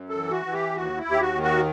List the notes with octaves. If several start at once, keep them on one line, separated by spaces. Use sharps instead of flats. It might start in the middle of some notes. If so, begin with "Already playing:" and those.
Already playing: F#2
A4
E3
F#4
E3
G4
D#2 F#4
E4
D#2
G4
F#4
D#3
F#4